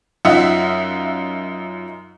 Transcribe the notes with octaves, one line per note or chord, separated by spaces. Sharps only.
F#2 D#4 F4 E5 F#5